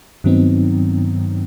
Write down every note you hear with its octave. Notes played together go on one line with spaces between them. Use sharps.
G2 D#3 F#3 B3 C4 D#4